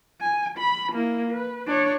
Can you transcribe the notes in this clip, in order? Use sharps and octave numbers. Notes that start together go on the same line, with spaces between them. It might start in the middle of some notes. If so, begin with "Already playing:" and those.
G#5
B5
A#3 E4
B4
D4 C#5